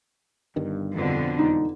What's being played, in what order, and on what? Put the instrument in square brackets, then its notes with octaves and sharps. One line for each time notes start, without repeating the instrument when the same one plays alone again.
[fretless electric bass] G1 G2 D#3
[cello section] F2 B2 D3
[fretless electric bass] E1 [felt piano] D#4